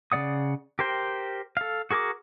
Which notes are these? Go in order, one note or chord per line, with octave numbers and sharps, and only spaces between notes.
C#3 C4 D5 F#5 D#6
G4 A#4 C5 G5
A4 F5
F#4 G#4 A#4 G#5 D6